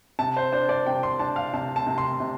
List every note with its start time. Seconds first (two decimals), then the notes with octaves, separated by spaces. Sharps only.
0.19 C3 A5
0.37 C5
0.53 D4 C5
0.69 D5
0.86 C3 G5
1.03 C6
1.19 D4 A5
1.36 F5
1.54 C3 A5
1.76 A5
1.87 C3
1.98 C6
2.20 C3